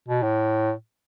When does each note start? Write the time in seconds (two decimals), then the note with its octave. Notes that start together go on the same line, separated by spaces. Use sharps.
0.08 B2
0.23 A2